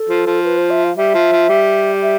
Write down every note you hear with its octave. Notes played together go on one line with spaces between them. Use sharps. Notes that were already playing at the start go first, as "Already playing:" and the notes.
Already playing: A4
F3
F3
B4
C5
E5
F5
G3 E5
F3
F3
G3
E5